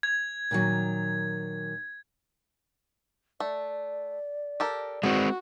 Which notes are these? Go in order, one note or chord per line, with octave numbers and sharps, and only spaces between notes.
G#6
A#2 D#3 F#3
A3 D5
G4 A4 A#4
G#3 B3 C4 F#4